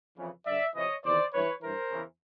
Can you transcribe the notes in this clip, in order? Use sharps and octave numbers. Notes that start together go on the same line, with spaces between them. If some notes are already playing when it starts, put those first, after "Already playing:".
F2 C#3 E3
G2 D3 D5 E5
F2 C3 E3 C#5 D#5
E2 C3 D#3 C5 D5
G2 E3 B4 C#5
G2 E3 A#4 C5
E2 C#3 E3